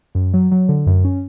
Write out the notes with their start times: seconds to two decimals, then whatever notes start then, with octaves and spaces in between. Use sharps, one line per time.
0.15 F#2
0.33 F#3
0.51 F#3
0.69 D3
0.86 F#2
1.04 C#4